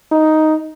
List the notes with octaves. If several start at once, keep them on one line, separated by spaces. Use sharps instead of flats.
D#4